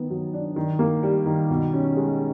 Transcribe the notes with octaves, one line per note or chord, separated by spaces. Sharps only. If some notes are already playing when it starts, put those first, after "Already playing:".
Already playing: D#3 B3
F#3
D4
D#3
A#3
G3
D#3
B2
C#4
G#3